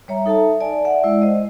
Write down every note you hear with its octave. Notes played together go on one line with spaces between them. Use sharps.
G3 C#5 E5 A#5
D#4 A4 E5 A5
D5 G#5 A5
D5 E5 F#5
G#3 E4 D5
C5 D#5